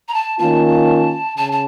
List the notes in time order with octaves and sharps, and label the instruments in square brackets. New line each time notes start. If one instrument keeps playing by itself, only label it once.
[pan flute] A#5
A5
[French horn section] D#3 A#3 C#4 F4 [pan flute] A5
[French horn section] C#3 [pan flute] A5
[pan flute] A5